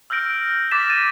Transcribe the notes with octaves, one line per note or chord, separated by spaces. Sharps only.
E6 F6 G6 A#6 D7
D6 F#6 A6 B6 E7
A6 D#7